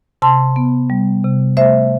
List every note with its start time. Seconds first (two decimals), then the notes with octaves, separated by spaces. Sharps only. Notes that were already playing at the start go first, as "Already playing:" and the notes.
0.22 C3 A5 C6
0.56 B3
0.90 G3
1.24 C3
1.57 A3 C5 E5